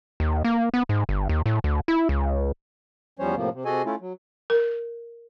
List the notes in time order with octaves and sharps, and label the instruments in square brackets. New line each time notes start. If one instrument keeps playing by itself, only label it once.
[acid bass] D#2
A#3
B3
G#2
G1
D#2
A2
D2
E4
C#2
[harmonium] E2 F3 G3 C#4 C5 C#5
A2 C3 F3 A#3
C3
C3 F#4 G#4 A4 D#5 G#5
A3 C#4 E4 F4
F#3
[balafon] A#4